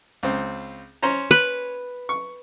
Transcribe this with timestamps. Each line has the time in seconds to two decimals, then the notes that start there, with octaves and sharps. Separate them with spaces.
0.23 C#2 C4
1.03 C#4 C5 A#5
1.31 B4
2.09 C#6